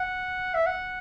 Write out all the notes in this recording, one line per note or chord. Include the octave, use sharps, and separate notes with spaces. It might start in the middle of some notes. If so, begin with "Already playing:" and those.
Already playing: F#5
E5
F#5